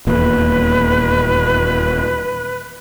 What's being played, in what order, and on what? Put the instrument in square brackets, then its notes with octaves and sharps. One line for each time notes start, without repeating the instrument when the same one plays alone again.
[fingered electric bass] D#1 E2 A#2 [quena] B4